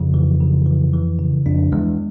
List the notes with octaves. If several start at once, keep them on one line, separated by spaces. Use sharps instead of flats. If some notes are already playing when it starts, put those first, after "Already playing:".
Already playing: F2 C#3
E3
C#3
E3
E3
C#3
F2 D4
E2 G#3